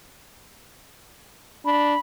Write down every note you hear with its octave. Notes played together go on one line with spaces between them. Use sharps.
D4 B5